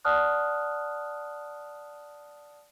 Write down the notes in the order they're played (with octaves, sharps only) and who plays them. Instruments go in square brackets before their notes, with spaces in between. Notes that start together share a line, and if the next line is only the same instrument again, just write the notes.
[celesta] D5 F#5 A5 D#6 F6 F#6